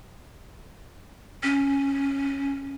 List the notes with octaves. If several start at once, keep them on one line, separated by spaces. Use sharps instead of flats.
C#4